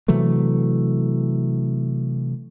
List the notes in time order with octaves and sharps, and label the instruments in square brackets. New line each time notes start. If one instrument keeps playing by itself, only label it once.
[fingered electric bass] C3 E3 F#3 A3